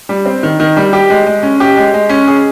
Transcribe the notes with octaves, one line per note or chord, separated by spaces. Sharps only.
G3
C4
D#3
D#3
G3
G4
G#3
G#3
C#4
G4
G#3
G#3
C#4
G#4